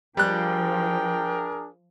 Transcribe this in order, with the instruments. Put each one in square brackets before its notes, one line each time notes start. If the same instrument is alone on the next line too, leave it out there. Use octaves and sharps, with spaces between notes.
[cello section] F3 [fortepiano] G3 F#6 [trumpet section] D4 G#4 A#4 [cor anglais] G5